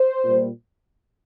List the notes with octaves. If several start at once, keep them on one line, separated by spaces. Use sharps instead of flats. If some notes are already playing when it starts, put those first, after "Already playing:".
Already playing: C5
A#2
G3